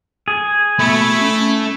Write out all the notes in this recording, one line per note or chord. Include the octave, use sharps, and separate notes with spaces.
G#4
B2 A3 E4 B5
C#4